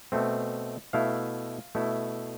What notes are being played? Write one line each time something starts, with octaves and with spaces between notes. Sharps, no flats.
B2 A3 C4
B2 A3 E4 F5
B2 A3 E4